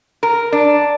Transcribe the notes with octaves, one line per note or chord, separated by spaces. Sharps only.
A#4
D4